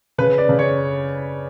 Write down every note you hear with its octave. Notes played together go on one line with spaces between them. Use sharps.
C#3 B4
D5
C#3
C#5